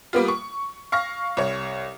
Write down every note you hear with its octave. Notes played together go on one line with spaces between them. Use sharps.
G3 A#3 B3 F4
C#6
F5 C#6 F6 A#6
C2 C#5